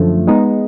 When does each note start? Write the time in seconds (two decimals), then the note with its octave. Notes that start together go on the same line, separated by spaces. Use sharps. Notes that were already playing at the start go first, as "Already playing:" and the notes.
Already playing: F#2 D3 F3 A3
0.27 G#3 B3 D#4